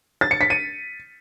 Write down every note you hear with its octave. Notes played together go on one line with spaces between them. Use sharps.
A6
C#7
B6
D#7